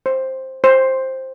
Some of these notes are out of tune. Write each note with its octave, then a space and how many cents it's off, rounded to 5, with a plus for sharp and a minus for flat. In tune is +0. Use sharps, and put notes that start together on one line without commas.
C5 +10
C5 +10